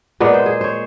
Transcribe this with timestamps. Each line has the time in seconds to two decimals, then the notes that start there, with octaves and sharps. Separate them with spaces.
0.20 A#2 G#3 B3
0.34 C5
0.46 G#4
0.61 C5 C#5